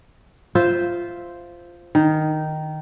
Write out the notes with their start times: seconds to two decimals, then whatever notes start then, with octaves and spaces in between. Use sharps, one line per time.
0.55 F4 C5 E5
1.95 D#3